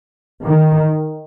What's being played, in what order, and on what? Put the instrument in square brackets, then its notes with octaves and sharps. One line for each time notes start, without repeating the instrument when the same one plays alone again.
[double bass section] D#3